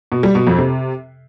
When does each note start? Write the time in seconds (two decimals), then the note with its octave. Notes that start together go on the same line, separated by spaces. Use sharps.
0.12 B2
0.23 G3
0.35 B2
0.47 F2
0.58 C3